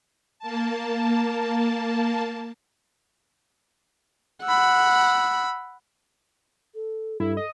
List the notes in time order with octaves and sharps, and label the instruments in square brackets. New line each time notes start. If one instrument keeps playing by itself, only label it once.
[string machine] A#3 A5
[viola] F#5 [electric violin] B5 E6
[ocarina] A4
[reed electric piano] G2 [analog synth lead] E4 [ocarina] A4
[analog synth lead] D#5